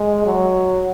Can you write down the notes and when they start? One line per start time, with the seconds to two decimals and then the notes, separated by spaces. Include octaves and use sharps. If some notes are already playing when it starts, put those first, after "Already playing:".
Already playing: G#3
0.26 F#3